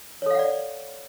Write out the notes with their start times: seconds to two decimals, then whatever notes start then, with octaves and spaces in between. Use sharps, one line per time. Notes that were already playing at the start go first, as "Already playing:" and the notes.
0.22 C#5
0.26 A4
0.31 F5
0.35 F#5
0.39 D5